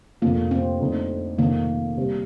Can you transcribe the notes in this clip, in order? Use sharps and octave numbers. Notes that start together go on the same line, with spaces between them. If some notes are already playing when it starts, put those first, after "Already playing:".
F1 F2 D3 F3 A#3
C4
F2 D3 A3 D#4
F1 F2 D#3 A#3
C3 G3 C4